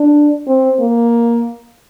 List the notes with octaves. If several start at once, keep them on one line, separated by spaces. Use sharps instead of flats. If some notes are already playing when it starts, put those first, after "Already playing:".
Already playing: D4
C4
A#3